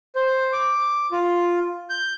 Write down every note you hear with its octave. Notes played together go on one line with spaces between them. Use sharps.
C5
D6
F4
G6